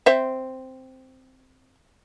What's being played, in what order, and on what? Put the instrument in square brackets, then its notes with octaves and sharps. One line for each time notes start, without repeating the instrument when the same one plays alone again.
[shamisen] C4 C5 E5